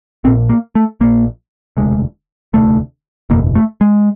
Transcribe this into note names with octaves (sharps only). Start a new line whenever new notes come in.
A#1 A#2 C4
A#3
A3
A#1 A#2 A#3
E1 D2 C3 G#3
E1 D2 C3 A3
F#1 E2 B2 A#3
A3
G#3